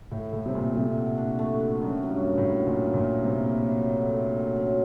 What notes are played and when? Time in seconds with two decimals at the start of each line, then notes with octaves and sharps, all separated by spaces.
0.12 A2 A3
0.33 A2 A3
0.46 C3
0.54 A#2 A3
0.75 C3 A3
0.97 F#4
1.18 D4
1.39 A3
1.60 F#4
1.81 F#2 D#3
2.03 F#3
2.10 G2
2.24 A#3
2.38 A2
2.45 A#3
2.66 A#2 F#3
2.87 A#3
2.94 A#2
3.09 A#3
3.23 C3
3.30 A#3
3.51 F#2
3.73 F#3
3.94 D3
4.14 A3
4.35 F#3
4.56 F#2